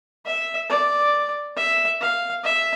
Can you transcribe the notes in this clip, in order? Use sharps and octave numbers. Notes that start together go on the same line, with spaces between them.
E5
D5
E5
F5
E5